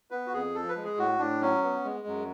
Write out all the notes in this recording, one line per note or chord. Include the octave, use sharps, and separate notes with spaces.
B3 B4
F#4
F2 G#4
F3 A4
B4
G#3
G#4
A2 F#4
A2 D4
F#3 C#4
B3
G#3
F#2